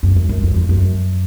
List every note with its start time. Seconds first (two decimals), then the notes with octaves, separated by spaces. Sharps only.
0.03 F#2
0.16 F#2
0.29 F#2
0.43 F2
0.56 F2
0.69 F#2